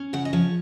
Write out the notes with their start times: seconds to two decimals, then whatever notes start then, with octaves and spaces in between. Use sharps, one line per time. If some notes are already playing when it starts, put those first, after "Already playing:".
Already playing: C#4
0.13 C#3 F#5
0.25 D#5
0.33 F3 C#5